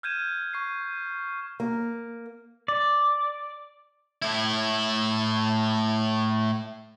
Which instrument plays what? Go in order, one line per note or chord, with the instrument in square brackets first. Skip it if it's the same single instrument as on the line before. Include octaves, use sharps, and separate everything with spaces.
[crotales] F6 G6 G#6 D#7 E7
C#6 C7
[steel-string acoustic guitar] A#3
[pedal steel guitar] D5
[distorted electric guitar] A2 E4